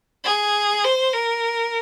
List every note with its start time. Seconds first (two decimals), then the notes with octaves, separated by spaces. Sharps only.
0.24 G#4
0.84 C5
1.13 A#4